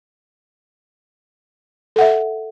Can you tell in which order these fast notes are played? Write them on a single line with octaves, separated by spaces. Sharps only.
A4 F#5 E5